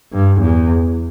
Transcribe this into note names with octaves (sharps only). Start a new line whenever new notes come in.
G2
E2